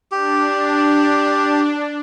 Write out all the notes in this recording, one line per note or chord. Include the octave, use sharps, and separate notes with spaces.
D4 G4